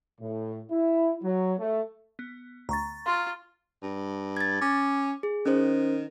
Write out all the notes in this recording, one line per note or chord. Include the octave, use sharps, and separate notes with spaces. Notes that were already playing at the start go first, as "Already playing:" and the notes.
A2
E4
F#3
A3
B3
D2 A#5 C#6 A6
F4 F5 C6
G2
G#6 A6
C#4 D6
G#4
D#3 C#4 C5